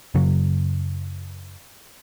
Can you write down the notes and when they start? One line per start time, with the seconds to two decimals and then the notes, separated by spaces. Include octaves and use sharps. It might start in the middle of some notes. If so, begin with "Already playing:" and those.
0.15 F#2 C#3 F#3